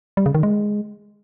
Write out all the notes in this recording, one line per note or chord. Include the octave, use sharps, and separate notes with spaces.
G3
C#3
D#3
G#3